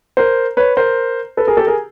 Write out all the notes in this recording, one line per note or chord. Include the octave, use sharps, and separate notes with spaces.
A#4 C5
B4 C#5
A#4 C5
A4 B4
G#4 A#4
G4 A4
G#4 A#4